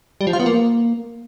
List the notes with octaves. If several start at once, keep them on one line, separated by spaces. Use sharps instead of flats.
G3
F3
F4
B3
A#3